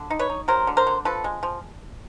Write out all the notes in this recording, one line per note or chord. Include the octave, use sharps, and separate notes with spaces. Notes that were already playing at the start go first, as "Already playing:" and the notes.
Already playing: D3
D#4
B4 C#5
D#4
F#3 A#4 C5
D3
A#4 C5
D3
F3 A4 B4
G#3
F3